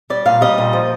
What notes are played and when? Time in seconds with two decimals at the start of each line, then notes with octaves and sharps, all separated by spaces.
0.10 G3 D5
0.26 A#2 F5
0.41 G3 D#5
0.58 A#2
0.73 F3